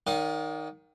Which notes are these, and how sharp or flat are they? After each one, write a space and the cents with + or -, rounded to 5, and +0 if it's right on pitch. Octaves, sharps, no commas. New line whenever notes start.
D#3 +0 D5 -40 F5 +40